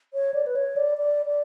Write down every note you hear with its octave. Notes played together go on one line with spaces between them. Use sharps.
C#5
D5
B4
C#5
D5
D5
D5